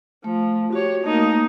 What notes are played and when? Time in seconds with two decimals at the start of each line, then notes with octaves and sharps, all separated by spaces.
0.24 F3 A3
0.73 F#4 G4 C#5
1.04 A3 A#3 D#4